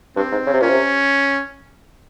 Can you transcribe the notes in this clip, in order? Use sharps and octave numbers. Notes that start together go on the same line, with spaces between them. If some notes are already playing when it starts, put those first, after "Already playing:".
G2 C4
G#2
C#3
C3
A#2 C#4
C3